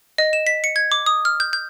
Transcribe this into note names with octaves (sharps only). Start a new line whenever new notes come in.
D#5
E7
B6
C#7
G#6
D6
D#6
F6
G6
G6